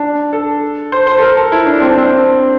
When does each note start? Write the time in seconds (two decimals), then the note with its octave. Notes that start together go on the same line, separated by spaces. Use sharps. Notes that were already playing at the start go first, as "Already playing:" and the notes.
Already playing: D4
0.33 A4
0.92 C5
1.07 C5
1.18 A4
1.22 A#4
1.37 A4
1.52 E4
1.66 D4
1.82 C4
1.91 D4
1.98 C4